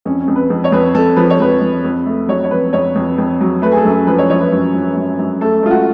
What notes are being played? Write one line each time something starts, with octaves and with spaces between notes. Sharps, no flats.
F2 C#4
C#4
F2
B4
F2
C#5
F2 B4
F2 A4
F3 B4
C#5
F2 B4
F2
F2
A3
F#3 C#5
C#5
F2 B4
F2 C#5
F2
F2
F#3
A3 B4
G#4
A4
F#2
A4
F3 B4
C#5
F3 C#5
B4
F#2
F3
F#2
F#2
A3 A4
A3 F4
F#4